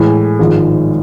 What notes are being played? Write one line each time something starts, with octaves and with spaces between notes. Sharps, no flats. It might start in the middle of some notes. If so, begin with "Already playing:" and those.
Already playing: A2 E3 G#3
G#1 G#2 F3